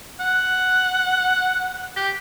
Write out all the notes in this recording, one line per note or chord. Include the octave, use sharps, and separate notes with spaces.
F#5
G4